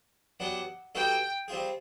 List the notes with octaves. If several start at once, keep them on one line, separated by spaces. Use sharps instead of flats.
F#3 B3 D4 G4 F#5
G3 B3 D#4 F#4 A4 G5
G3 C4 F4 G#4